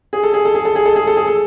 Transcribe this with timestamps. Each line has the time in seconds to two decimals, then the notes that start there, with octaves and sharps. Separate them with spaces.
0.13 G#4
0.23 A4
0.34 G#4
0.45 A4
0.55 G#4
0.65 A4
0.75 G#4
0.86 A4
0.96 G#4
1.07 A4
1.17 G#4
1.27 A4